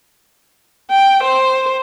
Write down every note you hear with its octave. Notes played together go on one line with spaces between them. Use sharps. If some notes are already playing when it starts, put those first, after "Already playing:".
G5
C5